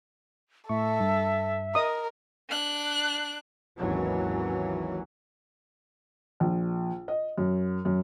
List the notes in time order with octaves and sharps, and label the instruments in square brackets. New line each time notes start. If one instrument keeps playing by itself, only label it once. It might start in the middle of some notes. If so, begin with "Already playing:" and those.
[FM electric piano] A2 C#6 [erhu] A4 [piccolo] E5
[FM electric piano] G2
[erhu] A#4 [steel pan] D#5 D#6
[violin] D4 F#6
[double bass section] G#1 D#2 E3 F#3 C#4
[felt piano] A#1
D#5
F#2
F#2